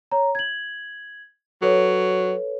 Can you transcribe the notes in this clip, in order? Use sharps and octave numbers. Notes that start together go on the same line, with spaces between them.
C#5 A#5
G#6 F#7
F#3 A4 B4 C#5